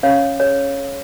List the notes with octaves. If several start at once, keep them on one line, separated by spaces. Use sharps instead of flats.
C#4 C#5 F5
G#4 C#5